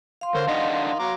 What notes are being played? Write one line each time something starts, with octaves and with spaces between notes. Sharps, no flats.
F5 C6
D3 A#4 C5 C#5
D#3 D4 D#4 D#5 F#5
F#3 A#5 D6